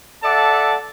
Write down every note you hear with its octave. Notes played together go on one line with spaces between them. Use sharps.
A4 D5 E5 F#5 A5 D6